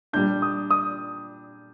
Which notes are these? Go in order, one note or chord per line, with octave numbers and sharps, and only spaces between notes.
A#2 G3 D4 G6
D#6
D#6